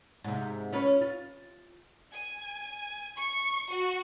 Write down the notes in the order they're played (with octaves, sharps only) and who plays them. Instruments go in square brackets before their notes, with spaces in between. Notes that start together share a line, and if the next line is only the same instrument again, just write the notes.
[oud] G#2 C3
C#4 F4 B4
F4
[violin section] G#5
G#5
C#6
F#4